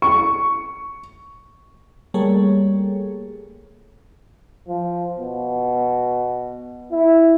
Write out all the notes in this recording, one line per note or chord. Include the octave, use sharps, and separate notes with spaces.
C#6
G3 A3 A#3 G#4 A4 C#5
F3
B2
E4